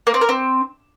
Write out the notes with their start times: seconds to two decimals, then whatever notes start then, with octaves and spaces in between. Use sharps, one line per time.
0.07 A#3
0.14 C4
0.21 A#4
0.29 C4